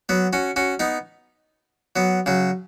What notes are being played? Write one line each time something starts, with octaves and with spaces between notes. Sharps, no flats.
F#3 B3
C#4 F#4
C#4 F#4
B3 D#4
F#3 B3
C#3 F#3